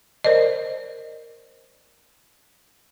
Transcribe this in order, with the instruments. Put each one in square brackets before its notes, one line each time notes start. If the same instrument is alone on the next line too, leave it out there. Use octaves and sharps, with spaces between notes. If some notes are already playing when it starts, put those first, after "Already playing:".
[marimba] A#4 C5 D5 D#5